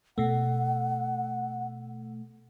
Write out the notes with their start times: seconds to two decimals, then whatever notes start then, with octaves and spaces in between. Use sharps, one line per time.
0.18 B2 A3 F#5